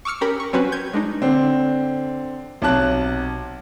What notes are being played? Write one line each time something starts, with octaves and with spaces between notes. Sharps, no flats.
C#6 D6 E6 F6 C#7
C#4 G4 A#4 B5
C#6
F#3 C4 C#4 F#4 B4
G6 G#6
G#3 D4 D#4
D3 C4
B1 C3 A5 F#6